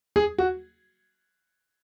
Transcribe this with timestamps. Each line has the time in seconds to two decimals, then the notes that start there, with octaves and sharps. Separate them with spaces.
0.16 G#4
0.38 F#4